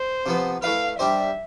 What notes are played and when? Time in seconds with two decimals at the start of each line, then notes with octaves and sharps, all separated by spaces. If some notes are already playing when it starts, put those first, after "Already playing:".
Already playing: C5
0.26 C3 F3 B3
0.62 A3 E4 B4 F5
0.99 G3 D4 G4 C5 E5